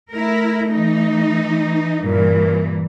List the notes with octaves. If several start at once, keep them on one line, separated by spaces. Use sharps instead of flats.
A3 E4 A#4
E3 D#4
G2 A#2 E3 A#4